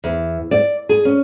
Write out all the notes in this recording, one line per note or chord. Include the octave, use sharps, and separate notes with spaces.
E2
D5
G#4
C#4